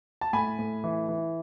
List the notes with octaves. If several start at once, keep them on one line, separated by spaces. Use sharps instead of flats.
A5
A2 G#5 B5
A2
E3
E3